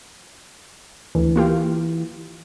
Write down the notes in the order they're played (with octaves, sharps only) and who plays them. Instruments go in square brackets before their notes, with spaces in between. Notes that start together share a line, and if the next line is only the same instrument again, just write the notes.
[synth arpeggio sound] D2 [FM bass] E3
[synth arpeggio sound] A#3 F4 G4